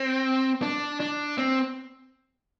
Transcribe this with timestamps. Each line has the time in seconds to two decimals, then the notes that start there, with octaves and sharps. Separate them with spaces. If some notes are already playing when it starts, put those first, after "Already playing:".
Already playing: C4
0.62 D4
1.00 D4
1.38 C4